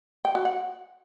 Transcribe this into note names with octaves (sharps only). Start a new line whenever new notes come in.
G5
F#4
F#5